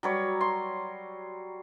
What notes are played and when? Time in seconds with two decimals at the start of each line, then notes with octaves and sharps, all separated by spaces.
0.03 F#3 G3 C#5
0.41 C6